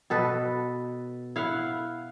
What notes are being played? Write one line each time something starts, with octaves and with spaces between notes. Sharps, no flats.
B2 A4 B4 D#5
E4 F5 F#5